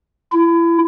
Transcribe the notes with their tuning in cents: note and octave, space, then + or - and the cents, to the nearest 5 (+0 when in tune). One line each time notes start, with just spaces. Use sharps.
E4 +30